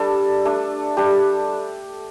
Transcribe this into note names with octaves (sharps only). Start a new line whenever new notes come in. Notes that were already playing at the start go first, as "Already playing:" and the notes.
Already playing: G3 A3 D4 A4
A3 D4
G3 D4 G4